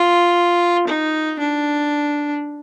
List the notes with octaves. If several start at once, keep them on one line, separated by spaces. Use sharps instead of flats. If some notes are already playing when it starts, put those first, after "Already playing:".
Already playing: F4
D#4
D4